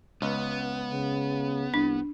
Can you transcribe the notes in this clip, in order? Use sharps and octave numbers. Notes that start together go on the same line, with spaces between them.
C#2 B3
C#3
C2 D4